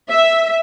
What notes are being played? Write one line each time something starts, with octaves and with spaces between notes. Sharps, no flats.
E5